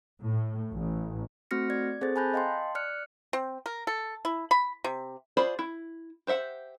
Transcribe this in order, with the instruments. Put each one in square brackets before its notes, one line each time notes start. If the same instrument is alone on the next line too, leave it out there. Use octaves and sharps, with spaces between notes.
[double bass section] A2
A1
[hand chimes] A3 C4 F#4 F6 A#6 C#7
D5 G#6
C4 G#4 A4 C5 A6
G#5 A5 B5 F#6 G6 A#6
D#5 F5 G5 A5 C6
D5 F6 F#6 C#7
[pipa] C4
A#4
A4
E4
B5
C3
[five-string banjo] F4 G#4 C5 D5 B5
E4
G4 C5 E5 F#5